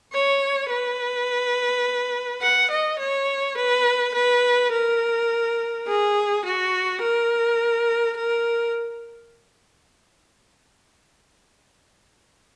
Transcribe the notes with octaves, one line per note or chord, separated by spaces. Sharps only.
C#5
B4
F#5
D#5
C#5
B4
B4
A#4
G#4
F#4
A#4
A#4